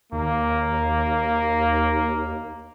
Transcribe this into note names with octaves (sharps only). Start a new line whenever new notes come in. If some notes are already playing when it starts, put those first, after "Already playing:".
D#2 A#3